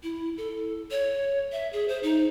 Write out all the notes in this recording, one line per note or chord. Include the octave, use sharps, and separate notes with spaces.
E4
A4
C#5
E5
G#4
C5
D#4